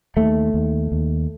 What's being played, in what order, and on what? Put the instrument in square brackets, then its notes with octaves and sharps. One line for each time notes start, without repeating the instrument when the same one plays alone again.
[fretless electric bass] D#2 A3
D#2
D#2